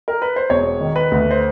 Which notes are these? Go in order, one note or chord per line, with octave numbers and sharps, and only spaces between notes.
A#4
B4
C5
E1 C#5
D#3
B4
D2
C5